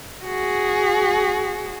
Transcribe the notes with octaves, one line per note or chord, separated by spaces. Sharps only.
F#4 G#4